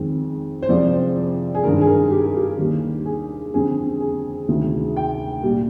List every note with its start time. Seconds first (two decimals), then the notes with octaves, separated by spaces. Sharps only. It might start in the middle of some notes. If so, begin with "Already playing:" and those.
Already playing: F2 D#3 G#3
0.62 C5
0.69 F2 C3 F3 G#3 D5
1.55 G#4
1.63 G2 D#3 G#3 A#4
1.81 G#4
1.87 A#4
2.11 G4
2.24 G#4
2.37 G4
2.58 D#2 D#3 G3
3.06 G#4
3.53 F2 D3 G3 G#4
4.00 G#4
4.48 D2 C3 D#3 G#3
4.97 G5
5.43 A#2 G3